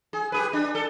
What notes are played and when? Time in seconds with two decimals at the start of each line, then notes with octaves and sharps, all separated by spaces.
0.13 G#4
0.32 G4 G#4 B4
0.53 D4
0.75 A4